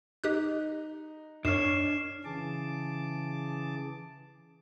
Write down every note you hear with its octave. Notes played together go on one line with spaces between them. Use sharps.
D#4 G4 D#6 F#6
F#2 D4 C#5 F6 C7 E7
C#3 E3 G#4 A5 D6